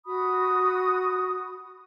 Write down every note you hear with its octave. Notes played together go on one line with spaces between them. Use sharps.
F#4 B5 D#6